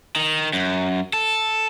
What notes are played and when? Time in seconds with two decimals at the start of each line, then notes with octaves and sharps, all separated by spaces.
0.16 D#3
0.53 F#2
1.13 A4